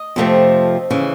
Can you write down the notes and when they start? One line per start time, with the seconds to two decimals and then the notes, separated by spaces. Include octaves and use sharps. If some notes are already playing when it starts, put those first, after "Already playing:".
Already playing: D#5
0.16 F2 C3 F3 A3 C4
0.91 C#3 E3